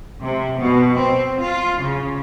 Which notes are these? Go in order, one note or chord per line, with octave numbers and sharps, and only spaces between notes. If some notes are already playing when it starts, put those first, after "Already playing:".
C3
B2
C4
F4
C#3